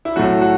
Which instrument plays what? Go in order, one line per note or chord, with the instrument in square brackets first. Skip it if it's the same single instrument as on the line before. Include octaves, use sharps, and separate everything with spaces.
[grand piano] E4
A2 F#3 A3 F#4
F#4